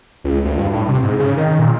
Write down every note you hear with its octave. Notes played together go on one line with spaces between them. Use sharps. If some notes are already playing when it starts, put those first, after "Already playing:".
C#2
D2
G2
A2
C3
G#2
C#3
D#3
A#2